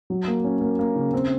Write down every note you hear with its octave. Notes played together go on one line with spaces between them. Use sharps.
F#3
A#3
C#4
A#3
A#3
C#3
C4